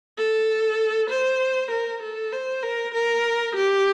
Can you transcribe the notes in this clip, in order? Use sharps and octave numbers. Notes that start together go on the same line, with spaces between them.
A4
C5
A#4
A4
C5
A#4
A#4
G4